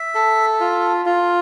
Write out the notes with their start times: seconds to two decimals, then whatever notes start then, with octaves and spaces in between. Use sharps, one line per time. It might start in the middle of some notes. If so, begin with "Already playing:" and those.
Already playing: E5
0.15 A4
0.60 F4
1.06 F4